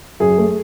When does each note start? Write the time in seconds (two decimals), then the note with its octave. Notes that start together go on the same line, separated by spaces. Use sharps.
0.20 F#2 G#4
0.38 A3